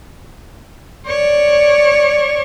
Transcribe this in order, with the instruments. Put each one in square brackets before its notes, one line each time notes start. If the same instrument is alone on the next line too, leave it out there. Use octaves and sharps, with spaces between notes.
[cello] C#5 D5